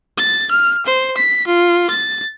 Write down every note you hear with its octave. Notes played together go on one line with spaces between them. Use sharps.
A6
F6
C5
B6
F4
A6